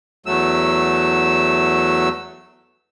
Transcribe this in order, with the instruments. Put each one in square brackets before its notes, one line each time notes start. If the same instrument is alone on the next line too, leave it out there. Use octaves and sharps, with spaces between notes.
[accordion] E2 F#3 A3 E6